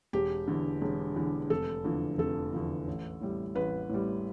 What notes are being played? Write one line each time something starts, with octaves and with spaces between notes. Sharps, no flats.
E1 G4
E2 D3
E1
E2 D3
F1 A4
E2 D3 F3
F1 A4
E2 D3 F3
A1
A2 G3
A1 B4
A2 G3